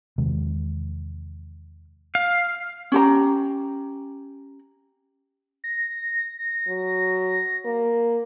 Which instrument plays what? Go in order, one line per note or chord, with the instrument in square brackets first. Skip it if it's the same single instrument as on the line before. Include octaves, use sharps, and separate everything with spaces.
[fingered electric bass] E2 C3 D#3 G#3
[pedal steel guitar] F5
[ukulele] C#4 G4 A#5
[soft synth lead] A#6
[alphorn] F#3
A#3